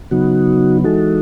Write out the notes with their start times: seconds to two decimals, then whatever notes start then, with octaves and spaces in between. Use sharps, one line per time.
0.11 C#3 F#3 B3 D#4 F#4
0.84 E3 G#3 D#4 F#4 A4